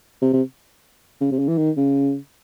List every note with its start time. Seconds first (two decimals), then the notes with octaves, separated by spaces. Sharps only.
0.22 C3
0.33 C3
1.21 C#3
1.31 C3
1.39 C#3
1.48 E3
1.58 D#3
1.77 C#3